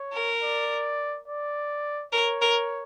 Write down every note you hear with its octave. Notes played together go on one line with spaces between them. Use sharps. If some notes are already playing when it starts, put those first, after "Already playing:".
Already playing: C#5
A#4
D5
D5
A#4 C#5
A#4